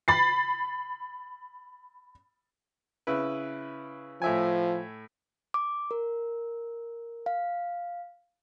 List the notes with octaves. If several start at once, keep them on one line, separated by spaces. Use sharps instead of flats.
B5 A6 C7
C#3 E4 B4
A2 F3 E5 G#5
D6
A#4
F5